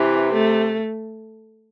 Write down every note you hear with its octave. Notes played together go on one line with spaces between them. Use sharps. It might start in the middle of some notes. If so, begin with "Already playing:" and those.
Already playing: C3 E3
A3